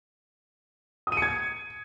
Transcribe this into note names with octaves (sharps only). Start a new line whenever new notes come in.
D#6
D#7
C#7
G#6